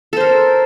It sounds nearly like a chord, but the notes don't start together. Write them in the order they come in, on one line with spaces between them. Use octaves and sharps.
A4 C5 A#4